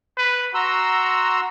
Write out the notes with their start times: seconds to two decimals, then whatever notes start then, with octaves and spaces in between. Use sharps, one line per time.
0.17 B4
0.55 F#4 A#5 C6 E6